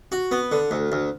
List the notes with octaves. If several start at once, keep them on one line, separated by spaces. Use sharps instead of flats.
F#4
B3
D3
D2
D2